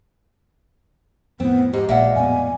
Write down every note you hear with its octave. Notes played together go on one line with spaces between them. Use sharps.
F2 A2 B3 C4
G#2 G4
A#1 A#2 G#3 E5 F#5
F2 A2 B3 G#5